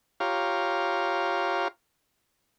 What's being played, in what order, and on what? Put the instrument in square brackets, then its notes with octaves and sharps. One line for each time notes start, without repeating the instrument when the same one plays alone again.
[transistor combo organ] F4 G4 C#5 F5 A#5